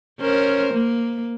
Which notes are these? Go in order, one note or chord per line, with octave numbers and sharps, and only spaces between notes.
C#4 A#4 C5
A#3